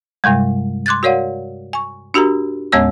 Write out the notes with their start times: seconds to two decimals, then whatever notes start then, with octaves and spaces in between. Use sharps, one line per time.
0.24 G2 C3 G3 G#3
0.86 C6 D6 F#6 G#6 A6
1.03 F#4 A#4 C#5 D5 F5 F#5
1.73 G#5 C#6
2.14 D4 F#4 G4 A#4 A#5
2.72 D#2 A2 G#3 B3 C#5 E6